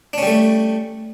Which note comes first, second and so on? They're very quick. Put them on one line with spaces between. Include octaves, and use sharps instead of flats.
D4 C#4 G3 A3